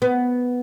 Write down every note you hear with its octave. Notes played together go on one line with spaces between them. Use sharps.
B3